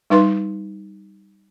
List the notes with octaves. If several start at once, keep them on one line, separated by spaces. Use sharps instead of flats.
G3 D#4 B4 C6